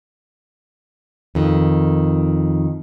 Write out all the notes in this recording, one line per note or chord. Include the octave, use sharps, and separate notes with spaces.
F2 D#3